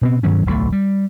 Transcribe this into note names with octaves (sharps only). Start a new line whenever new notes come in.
B2 B3 C4
G2 D#3 F#3 C#4
D1 B1 A#2 A3
G3